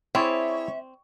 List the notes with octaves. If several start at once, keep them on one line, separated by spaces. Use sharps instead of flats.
C4 E4 G#4 C#5 D5 E5